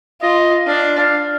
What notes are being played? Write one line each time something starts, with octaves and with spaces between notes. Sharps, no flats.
F4 D#5
D4 F5
F5